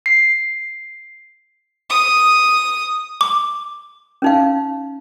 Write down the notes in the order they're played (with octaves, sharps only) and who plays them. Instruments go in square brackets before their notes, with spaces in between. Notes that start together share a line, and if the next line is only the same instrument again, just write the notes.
[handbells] C7
[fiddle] D#6
[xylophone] D6
[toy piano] C#4 D#4 F5